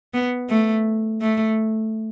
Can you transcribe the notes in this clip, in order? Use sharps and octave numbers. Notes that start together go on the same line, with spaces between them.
B3
A3
A3